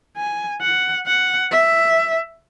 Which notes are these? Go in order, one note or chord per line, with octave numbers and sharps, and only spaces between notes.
G#5
F#5
F#5
E5